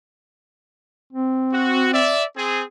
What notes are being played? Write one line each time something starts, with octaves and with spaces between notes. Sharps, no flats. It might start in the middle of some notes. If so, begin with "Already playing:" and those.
C4
F#4
D5 E5
C4 G#4